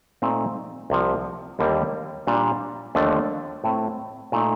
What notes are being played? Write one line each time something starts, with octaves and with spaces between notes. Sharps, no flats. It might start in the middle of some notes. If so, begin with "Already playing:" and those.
A#2 A3 C4 D#4
C2 C3 F3
D#2 D3 G3 A#3
A#2 G3 D4
D#2 D3 F3 A3 D4
A2 A3 C4
A#2 A3 D#4